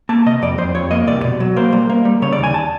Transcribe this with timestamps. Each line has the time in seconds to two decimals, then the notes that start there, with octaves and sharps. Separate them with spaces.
0.09 A#3 A5
0.26 C3 D#5
0.42 F2 D5
0.58 F2 C5
0.75 F2 C#5
0.91 A#3 D#5
1.07 C2 D5
1.24 B2
1.40 F#3
1.56 A#3 C5
1.72 G3
1.90 A#3
2.05 G3
2.22 C#3 C#5
2.32 D5
2.38 D#2
2.44 G#5
2.54 A5